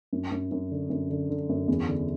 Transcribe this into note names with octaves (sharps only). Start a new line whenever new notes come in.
F#2
F#2
F#2
D3
F#2
D3
D3
F#2
E2
D3